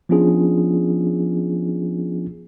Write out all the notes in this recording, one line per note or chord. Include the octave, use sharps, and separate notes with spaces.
F3 B3 C#4 D4 F4 G#4